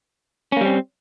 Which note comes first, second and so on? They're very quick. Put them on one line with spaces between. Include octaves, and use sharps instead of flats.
C#4 A#3 G3 C4